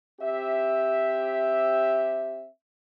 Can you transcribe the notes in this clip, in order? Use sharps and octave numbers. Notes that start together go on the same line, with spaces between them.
C4 G4 E5